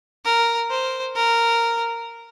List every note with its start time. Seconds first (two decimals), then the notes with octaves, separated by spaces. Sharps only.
0.25 A#4
0.70 C5
1.16 A#4